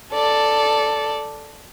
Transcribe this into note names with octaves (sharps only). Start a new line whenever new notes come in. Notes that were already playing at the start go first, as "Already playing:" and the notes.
A4 D5